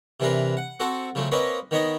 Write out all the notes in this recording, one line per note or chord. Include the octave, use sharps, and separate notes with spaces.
C3 E3 D4 A#4 B4
F#5
C4 F#4 A4 F#5 A5
C#3 F3 F#3 A3
A#3 C4 C#4 B4 C#5 D#5
D#3 B3 C#5 D#5 B5